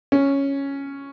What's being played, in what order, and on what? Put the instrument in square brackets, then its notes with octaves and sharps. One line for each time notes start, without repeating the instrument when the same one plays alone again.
[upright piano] C#4